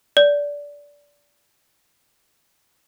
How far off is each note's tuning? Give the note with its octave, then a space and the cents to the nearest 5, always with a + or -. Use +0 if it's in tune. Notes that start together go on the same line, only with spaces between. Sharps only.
D5 -20